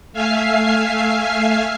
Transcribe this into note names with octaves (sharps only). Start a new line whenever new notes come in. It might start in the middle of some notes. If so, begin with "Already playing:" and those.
A3 E5 F5 G#5 F6 C7